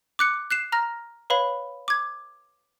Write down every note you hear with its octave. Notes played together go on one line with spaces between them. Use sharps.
D6 F#6 C#7
F#6 C7 E7
A#5 F6 A#6
B4 C#5 F5 B5
D6 G#6